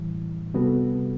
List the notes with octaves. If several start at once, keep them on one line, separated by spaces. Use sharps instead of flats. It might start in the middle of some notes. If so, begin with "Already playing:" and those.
Already playing: A2 E3 G3
C3 G3 B3 F#4 A4